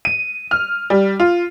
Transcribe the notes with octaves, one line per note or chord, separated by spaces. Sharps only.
D#7
F6
G3
F4